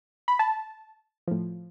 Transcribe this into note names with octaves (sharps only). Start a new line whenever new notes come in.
B5
A5
A2 F3